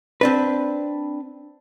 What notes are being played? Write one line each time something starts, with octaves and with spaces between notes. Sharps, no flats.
C4 D4 B4